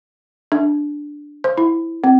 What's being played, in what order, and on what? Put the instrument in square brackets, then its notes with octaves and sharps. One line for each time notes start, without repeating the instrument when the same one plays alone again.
[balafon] D4
C5
E4
C4